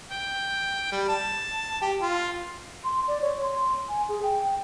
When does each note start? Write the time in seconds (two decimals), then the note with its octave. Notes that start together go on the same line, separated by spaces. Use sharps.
0.11 G5
0.92 G3
1.09 A5
1.82 G4
2.02 F4
2.84 C6
3.08 D5
3.22 C#5
3.43 C6
3.89 G#5
4.09 G#4
4.23 G5